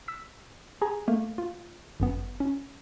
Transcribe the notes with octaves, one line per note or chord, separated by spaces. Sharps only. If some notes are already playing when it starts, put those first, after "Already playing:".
E6 B6
G4 G#4 G#5 A#5
A3 A#3 F5
F4
G1 F#2 B3
C#4